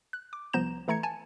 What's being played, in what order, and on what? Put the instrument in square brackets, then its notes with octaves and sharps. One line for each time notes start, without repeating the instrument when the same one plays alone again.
[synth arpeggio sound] F#6
D6
C2 F3 B3 A#5 G6 E7
E3 A3 A#5 G#6 C#7
G#5 A5